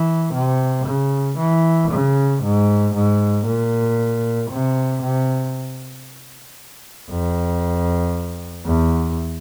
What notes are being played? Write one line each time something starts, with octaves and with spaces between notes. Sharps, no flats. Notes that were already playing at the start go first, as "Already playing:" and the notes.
Already playing: E3
C3
C#3
E3
C#3
G#2
G#2
A#2
C3
C3
F2
E2